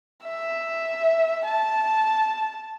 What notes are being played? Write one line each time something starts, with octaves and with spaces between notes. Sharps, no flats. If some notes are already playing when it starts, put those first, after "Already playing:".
E5
A5